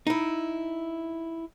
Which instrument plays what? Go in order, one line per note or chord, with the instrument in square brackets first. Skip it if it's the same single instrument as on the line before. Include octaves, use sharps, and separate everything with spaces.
[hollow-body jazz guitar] D#4 E4